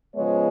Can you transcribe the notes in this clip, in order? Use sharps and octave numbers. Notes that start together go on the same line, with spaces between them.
C#3 F3 G#3 B3 C#5